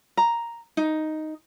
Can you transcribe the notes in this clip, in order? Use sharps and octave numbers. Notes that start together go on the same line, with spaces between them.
A#5
D#4